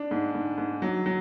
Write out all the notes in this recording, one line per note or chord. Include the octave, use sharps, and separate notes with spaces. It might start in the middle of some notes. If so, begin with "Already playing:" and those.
Already playing: D4
G#2
G#2
G#2
F#3
F#3